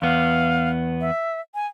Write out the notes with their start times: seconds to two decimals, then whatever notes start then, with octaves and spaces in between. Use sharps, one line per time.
0.02 E2 B3 F5
1.01 E5
1.55 G#5